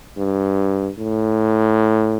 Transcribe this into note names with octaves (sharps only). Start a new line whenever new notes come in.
G2
A2